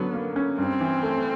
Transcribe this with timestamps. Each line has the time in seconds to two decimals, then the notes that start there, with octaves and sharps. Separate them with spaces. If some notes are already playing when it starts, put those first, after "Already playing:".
Already playing: D3 F#3 B3 C#4
0.14 A#3
0.36 C#4
0.58 G2 C4
0.80 E3
1.03 A3